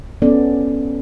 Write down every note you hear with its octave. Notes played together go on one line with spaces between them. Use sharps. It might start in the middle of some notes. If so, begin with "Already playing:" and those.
B3 C#4 A4 D5